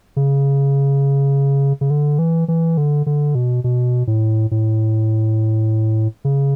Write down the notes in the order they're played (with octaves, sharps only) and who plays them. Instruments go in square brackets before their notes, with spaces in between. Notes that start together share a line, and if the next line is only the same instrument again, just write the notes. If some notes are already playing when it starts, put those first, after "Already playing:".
[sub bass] C#3
C#3
D3
E3
E3
D3
D3
B2
B2
A2
A2
C#3